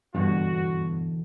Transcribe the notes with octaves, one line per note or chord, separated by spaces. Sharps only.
E2 G2 B2 D3 F#4